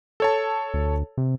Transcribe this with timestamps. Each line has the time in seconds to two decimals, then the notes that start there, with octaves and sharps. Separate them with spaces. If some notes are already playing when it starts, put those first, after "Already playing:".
0.20 A4 C#5 A5
0.74 D2
1.18 C3